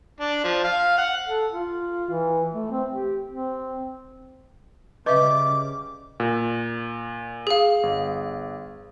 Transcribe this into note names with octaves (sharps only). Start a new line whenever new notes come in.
D4
F3
F5
F#5
A4
F4
E3
A3
C4
G4
C4
C#3 G3 B4 D#5 E5 C#6 D6
A#2
G#4 F5
G1